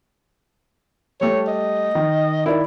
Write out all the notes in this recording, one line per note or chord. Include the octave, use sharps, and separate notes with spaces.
G3 A3 C#5
D#5
D#3
D#3 E4 D5